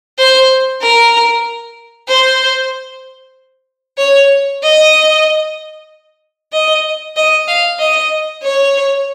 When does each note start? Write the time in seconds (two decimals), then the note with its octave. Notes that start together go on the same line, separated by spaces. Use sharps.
0.18 C5
0.81 A#4
2.08 C5
3.98 C#5
4.63 D#5
6.53 D#5
7.16 D#5
7.48 F5
7.79 D#5
8.43 C#5